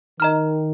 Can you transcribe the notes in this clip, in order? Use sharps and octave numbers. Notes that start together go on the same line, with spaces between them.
D#3 D#5 A#5 F6